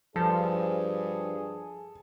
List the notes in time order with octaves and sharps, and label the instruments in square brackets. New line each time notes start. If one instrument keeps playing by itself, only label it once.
[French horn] G2 [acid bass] F3 [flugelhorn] G#4 [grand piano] A4